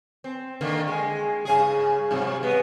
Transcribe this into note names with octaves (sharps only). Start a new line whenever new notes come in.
C4
D3 D#3 A#3
G#3
G2 C#3 G#4
G2 C3 F#3
G#3 B3